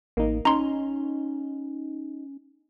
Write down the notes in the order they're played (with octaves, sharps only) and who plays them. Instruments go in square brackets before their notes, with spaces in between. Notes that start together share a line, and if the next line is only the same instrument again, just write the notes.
[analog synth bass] A1 [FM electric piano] A#3 D#4
[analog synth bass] C#4 [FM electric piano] D#4 [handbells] A#5 C6